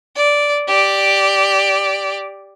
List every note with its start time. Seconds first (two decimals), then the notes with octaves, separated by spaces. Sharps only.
0.16 D5
0.68 G4 D5